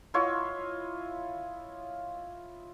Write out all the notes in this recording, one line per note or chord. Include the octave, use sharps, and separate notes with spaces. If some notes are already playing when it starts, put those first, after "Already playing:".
E4 F4 C#5 D#5